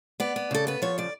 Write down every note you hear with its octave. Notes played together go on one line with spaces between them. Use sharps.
B3 D5
B3
C#3 A4
B3 B4
F3 C#5
C#3 D5